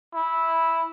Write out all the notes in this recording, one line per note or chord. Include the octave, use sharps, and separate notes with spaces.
E4